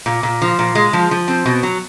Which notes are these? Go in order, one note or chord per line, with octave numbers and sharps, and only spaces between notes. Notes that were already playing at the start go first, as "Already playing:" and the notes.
A#2
A#2
F3
A#2
G#3
F3
F3
C4
B2
F#3